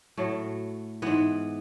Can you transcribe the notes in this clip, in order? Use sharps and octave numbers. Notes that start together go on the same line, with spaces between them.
A2 F#3 A3
G#2 E3 B3